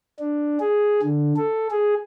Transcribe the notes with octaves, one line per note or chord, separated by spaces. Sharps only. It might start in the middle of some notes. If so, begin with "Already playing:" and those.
D4
G#4
D3
A4
G#4